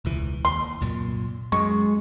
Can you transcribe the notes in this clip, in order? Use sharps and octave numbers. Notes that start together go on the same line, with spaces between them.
E1 C#2 E3
D#2 C6
C2 F#2 A#2
F#2 G#3 C#6